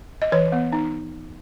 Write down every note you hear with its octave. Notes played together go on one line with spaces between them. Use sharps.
D#5
E3 C#5
B3
D#4